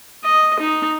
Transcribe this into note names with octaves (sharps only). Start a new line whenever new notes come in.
D#5
D#4